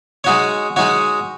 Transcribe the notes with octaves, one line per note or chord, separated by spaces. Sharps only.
G#3 D#4 F#4 C#5
G#3 D#4 F#4 C#5